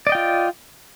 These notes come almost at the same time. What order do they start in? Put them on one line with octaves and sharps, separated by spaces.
D5 D#5 G5 F4